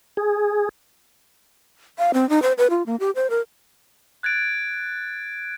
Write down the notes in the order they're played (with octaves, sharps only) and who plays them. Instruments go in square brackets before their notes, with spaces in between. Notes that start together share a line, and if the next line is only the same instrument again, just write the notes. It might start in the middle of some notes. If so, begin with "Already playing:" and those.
[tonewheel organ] G#4
[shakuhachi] F5
C4
D#4
C5
B4
F4
A#3
G4
C5
A#4
[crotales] F#6 G#6 A6 D7